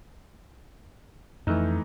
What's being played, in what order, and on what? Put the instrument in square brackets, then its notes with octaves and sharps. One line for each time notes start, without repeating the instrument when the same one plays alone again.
[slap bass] F2 [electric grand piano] E3 A3 D#4